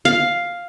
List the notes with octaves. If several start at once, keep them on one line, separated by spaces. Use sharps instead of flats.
F5